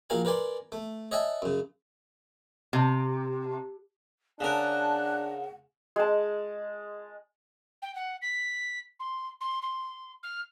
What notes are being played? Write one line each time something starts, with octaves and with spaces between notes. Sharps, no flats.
A#1 F#4 A#4 F5 G#5
A#4 B4 D5 G#5 C6
A3
C#5 D#5 E5 F#5 G#5 A5
F#2 C#3
C3
C#3 D4 A#4 F#5 A5 F#6
G#3 A5
G5
F#5
B6
C6
C6
C6
F6